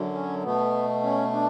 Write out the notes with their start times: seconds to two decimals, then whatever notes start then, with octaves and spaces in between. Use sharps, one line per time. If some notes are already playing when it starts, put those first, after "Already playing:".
Already playing: F#2 D3 F#3
0.14 C#4
0.43 B2 A3 B3
1.03 C#4
1.33 D4